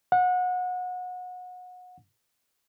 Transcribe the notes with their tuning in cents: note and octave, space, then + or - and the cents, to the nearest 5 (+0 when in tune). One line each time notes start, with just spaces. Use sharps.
F#5 -30